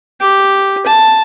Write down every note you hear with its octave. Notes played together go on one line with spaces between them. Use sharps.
G4
A5